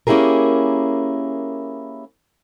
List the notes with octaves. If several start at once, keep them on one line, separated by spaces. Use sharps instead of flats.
A#3 C#4 E4 G4 G#4 A#4